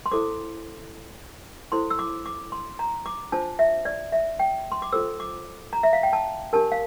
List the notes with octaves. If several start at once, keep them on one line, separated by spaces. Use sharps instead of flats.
C6
E4 A4 C5 D6
E4 A4 C5 C6
E6
D6
D6
C6
A#5
D6
D4 F4 C5 A5
E5
D5
E5
G5
C6
D6
F4 A4 C5 E6
D6
A#5
E5
F5
G5
A5
D4 G4 A#4 A5
F5